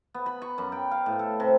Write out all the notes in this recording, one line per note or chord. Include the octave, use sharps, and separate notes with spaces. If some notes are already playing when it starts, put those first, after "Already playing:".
B3
B5
C#6
F#2
G5
F5
A2
A4
C3